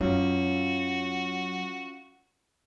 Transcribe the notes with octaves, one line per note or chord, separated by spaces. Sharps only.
F#2 F#3 C#4 F4 F#4